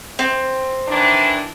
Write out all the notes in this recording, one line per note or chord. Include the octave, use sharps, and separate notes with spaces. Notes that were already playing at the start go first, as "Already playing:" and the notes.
C4
D#3 E3 D4